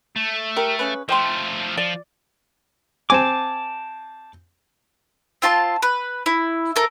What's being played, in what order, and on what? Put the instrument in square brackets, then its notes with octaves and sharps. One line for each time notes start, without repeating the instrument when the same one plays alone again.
[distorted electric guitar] A3
[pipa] G4 A#4
C#3 C#4 B4
[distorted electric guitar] F3 A3 [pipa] C5 G5 C6
[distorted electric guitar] F3 [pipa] D5
[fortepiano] C4 G#5 [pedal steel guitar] A5 D6
[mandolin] C4 F4 A5 C6
B4
E4
A4 A#4